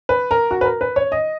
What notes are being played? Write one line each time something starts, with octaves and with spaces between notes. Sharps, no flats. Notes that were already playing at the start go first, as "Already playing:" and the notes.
B4
A#4
F#4
B4
A#4
B4
C#5
D#5